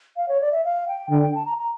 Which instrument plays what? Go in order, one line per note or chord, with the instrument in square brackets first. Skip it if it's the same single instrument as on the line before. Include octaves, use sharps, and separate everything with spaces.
[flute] F5
C#5
D5
E5
F5
G5
[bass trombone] D3 [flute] G5
[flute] G5
A5
A#5
A#5